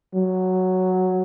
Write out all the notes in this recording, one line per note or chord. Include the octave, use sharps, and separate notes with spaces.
F#3